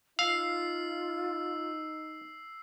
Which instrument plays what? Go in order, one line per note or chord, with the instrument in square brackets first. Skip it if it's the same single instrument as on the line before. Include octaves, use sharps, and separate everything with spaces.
[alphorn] D#4 [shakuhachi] F4 [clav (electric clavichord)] F5 [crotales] E6 C7